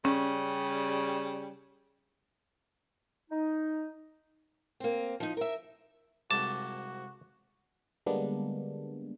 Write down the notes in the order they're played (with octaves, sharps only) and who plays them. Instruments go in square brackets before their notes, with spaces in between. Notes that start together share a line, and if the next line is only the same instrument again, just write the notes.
[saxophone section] C#3 G3 [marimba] C#4
[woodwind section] D#4
[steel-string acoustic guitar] A#3 C4
F3 D#4
A#4 E5
[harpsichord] C2 F2 G#2 [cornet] F#4 [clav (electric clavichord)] A5 [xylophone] D6
[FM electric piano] D3 G3 G#3 A#3 B3 D4